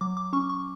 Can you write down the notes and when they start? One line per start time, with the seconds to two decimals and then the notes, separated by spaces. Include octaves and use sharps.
0.01 F#3 D6
0.17 D6
0.33 C#4 C#6
0.49 C#6